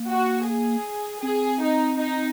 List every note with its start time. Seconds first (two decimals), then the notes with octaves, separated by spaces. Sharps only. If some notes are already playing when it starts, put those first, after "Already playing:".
Already playing: A#3
0.08 F#4
0.47 G#4
1.22 C4 G#4
1.61 D#4
1.99 D#4